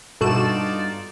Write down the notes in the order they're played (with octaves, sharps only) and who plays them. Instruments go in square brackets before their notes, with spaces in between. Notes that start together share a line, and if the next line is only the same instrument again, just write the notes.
[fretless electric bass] G2 [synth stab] B2 F#4 E7 [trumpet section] D#4 F4 D5 [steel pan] A4